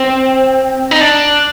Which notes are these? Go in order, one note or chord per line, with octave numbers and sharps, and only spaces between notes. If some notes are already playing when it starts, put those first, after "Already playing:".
Already playing: C4
D#4
D4